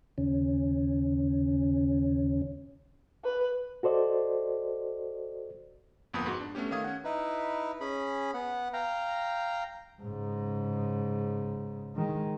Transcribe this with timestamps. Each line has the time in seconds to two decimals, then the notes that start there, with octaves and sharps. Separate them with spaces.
0.18 D#2 C#3 C#4
3.24 B4
3.83 F#4 A4 C5 D5 D#5
6.14 G1 F2 A#3 B3 B5 D#6
6.26 G#2 F#4
6.40 D4
6.55 A3 B3 C#4 G4
6.71 D#3 A3 F5 D#6 G#6
6.84 C#4 F#5
7.04 D#4 E4 B4
7.81 C#4 G#4 B5
8.34 B3 F#5
8.73 F5 G5 A#5
10.02 G#2 C#3
11.96 D#3 G#3